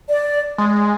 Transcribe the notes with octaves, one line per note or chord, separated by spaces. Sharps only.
D5
G#3